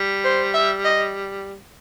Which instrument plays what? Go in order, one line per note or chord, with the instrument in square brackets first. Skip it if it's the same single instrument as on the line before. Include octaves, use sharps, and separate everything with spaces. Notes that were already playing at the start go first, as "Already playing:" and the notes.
Already playing: [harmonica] G3
[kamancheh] C5
E5
D#5